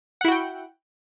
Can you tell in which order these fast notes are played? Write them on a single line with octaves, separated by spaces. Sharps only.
F#5 E4 F#4 G5